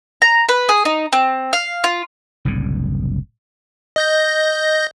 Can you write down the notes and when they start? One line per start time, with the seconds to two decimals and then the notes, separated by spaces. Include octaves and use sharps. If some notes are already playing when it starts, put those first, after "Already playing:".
0.22 A#5
0.49 B4
0.69 G#4
0.85 D#4
1.13 C4
1.53 F5
1.84 F4
2.45 F#1 C2 A2 D3
3.96 D#5 G6 A#6